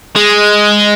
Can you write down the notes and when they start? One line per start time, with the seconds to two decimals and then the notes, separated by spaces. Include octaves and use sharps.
0.16 G#3